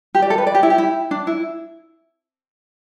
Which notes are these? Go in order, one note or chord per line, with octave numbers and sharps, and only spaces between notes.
G4
D5
A4
B4
D5
G4
E4
G4
E4
D4
E4